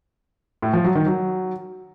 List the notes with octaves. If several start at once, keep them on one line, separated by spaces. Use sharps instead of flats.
A2
F3
F#3
D#3
F#3